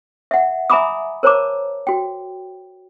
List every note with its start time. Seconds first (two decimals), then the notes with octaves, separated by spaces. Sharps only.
0.31 E5 F#5
0.70 E5 G#5 A#5 B5 D6 D#6
1.23 A#4 C5 C#5 A5 A#5 D6
1.87 F#4 G5